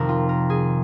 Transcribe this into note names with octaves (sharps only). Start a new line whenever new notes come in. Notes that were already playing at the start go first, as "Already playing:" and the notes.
Already playing: F2 C3 D#3 A#4
F4
A#4
G#4